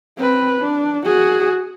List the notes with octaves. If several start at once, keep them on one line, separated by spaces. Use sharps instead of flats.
C4 B4
D4
F#4 G#4